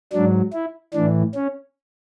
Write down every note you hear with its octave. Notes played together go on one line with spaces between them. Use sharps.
G#2 F#3 D4
E4
A2 E3 D4
C#4